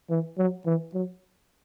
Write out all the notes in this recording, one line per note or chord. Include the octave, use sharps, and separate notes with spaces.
E3
F#3
E3
F#3